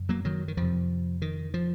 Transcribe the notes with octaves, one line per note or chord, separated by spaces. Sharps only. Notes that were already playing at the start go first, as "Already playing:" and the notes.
Already playing: F#2 C#3
F#3 A#3
D#3 F#3
D#3
F2 C3 F3
D#3
F3